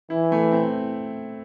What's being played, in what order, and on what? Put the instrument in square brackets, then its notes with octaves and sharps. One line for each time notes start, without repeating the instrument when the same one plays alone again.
[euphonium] E3 [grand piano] E4
[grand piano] A3
C4